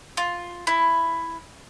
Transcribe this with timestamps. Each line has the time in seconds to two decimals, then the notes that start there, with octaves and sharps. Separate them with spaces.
0.17 F4
0.67 E4